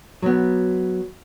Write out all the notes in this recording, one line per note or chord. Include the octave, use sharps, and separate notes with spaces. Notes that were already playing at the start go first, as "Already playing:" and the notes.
F#3 B3